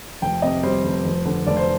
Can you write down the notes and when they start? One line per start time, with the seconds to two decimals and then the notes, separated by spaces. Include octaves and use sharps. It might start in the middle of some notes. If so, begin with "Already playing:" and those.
0.22 F1 G5
0.42 C3 D#5
0.63 G3 C5
0.85 F1
1.05 F1
1.25 D3
1.46 F1 D5
1.57 C5